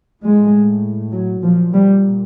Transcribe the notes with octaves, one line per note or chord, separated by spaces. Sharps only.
A2 G#3
F#3
A#2 F3
G3